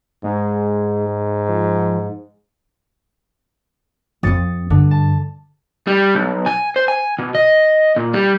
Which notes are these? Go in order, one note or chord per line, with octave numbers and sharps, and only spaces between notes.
G#2 G#3
F3
F2 C4 D#6 A6 C#7
G2 D3
A5
G3
B1
G#5
C5
G#5
B2
D#5
A#2
G3